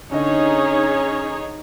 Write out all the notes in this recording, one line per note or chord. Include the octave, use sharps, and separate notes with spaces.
D3 C#4 D#4 G#4 C#5 D#5